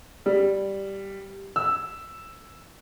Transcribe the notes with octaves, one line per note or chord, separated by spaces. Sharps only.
G3
E6